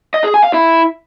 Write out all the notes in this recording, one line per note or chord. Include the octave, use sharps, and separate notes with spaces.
D#5
G#4
G#5
F5
E4